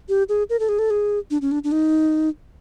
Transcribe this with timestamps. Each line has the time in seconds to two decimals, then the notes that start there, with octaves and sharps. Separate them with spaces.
0.09 G4
0.29 G#4
0.50 A#4
0.60 A4
0.69 G#4
0.79 A4
0.90 G#4
1.31 D4
1.42 C#4
1.52 D4
1.64 D4
1.72 D#4